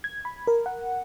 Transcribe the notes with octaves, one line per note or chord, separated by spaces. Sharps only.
G#6
B5
A#4
F#5